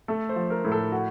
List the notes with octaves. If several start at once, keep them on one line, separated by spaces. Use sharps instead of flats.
A3 A4
C5
F3
A#4
A2
A4
F#4